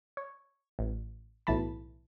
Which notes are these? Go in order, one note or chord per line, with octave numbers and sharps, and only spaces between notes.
C#5
A1
B1 A2 E3 A5 B5